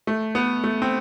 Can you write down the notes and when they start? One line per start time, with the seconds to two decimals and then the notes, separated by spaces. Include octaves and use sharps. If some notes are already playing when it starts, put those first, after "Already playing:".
0.07 A3
0.35 B3
0.64 A3
0.82 C4